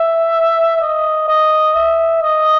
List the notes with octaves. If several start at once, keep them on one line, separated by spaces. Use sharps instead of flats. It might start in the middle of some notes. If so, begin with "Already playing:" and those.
Already playing: E5
D#5
D#5
E5
D#5